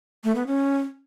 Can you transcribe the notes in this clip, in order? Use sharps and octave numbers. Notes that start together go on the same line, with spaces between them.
A3
B3
C#4